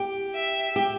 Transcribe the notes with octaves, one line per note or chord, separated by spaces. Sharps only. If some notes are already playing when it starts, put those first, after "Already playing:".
Already playing: G4
E5
G4